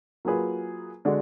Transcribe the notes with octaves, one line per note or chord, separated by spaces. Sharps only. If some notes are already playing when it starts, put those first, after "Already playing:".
F#3 A#3 F4 G#4 B4
D3 G#3 D4 F#4